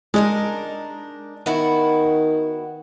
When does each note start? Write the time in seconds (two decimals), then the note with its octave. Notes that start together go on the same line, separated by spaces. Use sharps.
0.14 G#3 D4 D#4 A#4
1.46 D#3 B3 E4 F#4